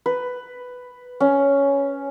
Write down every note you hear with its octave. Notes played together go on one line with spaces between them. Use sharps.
B4
C#4